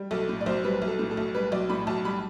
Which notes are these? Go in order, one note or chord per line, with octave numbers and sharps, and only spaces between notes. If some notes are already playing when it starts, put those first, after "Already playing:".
Already playing: G3
B1 A4
A2
D5
B1 C5
G3 B4
B1
A4
A2
A4
B1
G3 B4
B1 D5
A2 B5
B1 A5
G3 B5